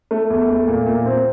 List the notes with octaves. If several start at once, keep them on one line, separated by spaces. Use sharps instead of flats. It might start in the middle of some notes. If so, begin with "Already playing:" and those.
A3
E2
A3
A#2
A#2
C4